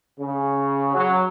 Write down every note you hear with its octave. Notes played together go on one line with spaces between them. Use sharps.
C#3
F#3